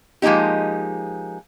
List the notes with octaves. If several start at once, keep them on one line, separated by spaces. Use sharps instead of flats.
F3 G#3 A#3 D#4 G4